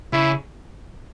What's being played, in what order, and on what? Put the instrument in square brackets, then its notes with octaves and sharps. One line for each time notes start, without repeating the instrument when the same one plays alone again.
[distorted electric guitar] C#3 [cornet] E4